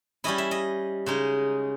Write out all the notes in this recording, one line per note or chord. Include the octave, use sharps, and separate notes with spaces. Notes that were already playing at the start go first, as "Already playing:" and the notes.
G3 C#4 E4 D#5
E5
D#5
C#3 G#3 D#4